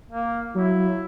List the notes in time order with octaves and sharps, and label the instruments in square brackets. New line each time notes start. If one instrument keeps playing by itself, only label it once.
[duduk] A#3
[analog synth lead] F#3 [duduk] E4